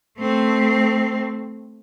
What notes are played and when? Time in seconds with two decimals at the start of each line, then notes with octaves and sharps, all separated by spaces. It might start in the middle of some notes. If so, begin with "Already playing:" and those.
0.18 A3 C4